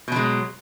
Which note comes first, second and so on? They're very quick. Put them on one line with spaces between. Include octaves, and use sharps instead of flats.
B2 F#3 G#3